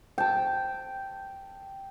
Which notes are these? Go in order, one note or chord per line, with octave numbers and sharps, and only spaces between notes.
G5 A5